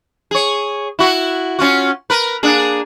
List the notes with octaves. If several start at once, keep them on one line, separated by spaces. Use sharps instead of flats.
G#4 C#5
E4 F#4
C#4 F4 F#4
A#4 B4
A#3 D4 G#4